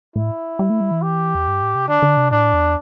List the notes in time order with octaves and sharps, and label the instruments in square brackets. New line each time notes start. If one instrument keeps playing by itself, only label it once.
[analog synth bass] A2 [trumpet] E4
[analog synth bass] G3
A3
G3
E3
[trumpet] G4
[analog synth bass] E2
G2
A2
C3
[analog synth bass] D3 [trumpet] D4
[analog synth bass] D3
C3
[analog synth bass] A2 [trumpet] D4
[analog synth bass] E2